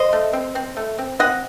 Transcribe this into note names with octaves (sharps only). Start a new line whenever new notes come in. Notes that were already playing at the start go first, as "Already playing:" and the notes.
Already playing: C5 D#5
A3
C4
C4
A3
C4
C4 D#5 F#5